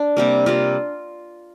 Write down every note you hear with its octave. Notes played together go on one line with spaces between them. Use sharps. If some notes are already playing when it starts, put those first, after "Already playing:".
Already playing: D4
C3 G3 A#3
C3 G3 A#3 F4